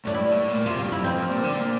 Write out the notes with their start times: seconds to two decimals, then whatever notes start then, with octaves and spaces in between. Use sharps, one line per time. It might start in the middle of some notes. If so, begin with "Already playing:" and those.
0.05 A2 D4
0.14 G2 E4
0.31 A2
0.49 A#2
0.66 C3 F4
0.79 F4
0.83 G2
0.92 E4
1.00 F2 C4
1.18 G2
1.30 A#2
1.43 D3
1.57 A#2